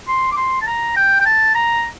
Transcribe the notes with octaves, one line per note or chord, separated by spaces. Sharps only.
C6
D6
C6
A5
A#5
G5
G5
A5
A#5